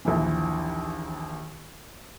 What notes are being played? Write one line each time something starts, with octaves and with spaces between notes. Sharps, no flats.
A#1 D#2 E3